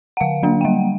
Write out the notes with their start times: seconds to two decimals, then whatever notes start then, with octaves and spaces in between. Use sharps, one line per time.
0.17 F#5
0.21 D3 F5
0.43 F#3 A#3 D4
0.61 G5
0.65 G3 F#5